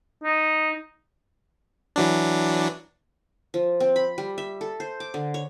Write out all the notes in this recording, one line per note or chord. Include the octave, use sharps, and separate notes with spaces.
D#4
E3 F#3 D4
F3
C4
B5
G3
E5
A4
C5
D6
D3
C#5